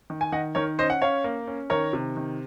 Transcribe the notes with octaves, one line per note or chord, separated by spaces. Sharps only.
D#3
G#5
D#3 D#5 F#5
D#3 A#4 C#5
C#4 C5 D#5
F#5
C#4 C#5 F5
A#3
C#4
D#3 A#4 C#5
C3
D#3